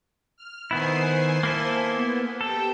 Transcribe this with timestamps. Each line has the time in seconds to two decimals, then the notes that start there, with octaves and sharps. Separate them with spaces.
0.37 F6
0.71 D#3 B3 E4 C5 G#5 C6
1.43 A#3 E4 A4
1.90 B3
2.41 G4 A4 G5